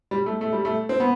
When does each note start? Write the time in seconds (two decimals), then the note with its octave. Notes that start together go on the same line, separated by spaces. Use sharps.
0.11 G3
0.26 A3
0.41 A3
0.53 G3
0.65 A3
0.89 C4
1.00 B3